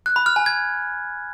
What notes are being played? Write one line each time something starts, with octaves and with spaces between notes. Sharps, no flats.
F#6
B5
F6
G#5
G#6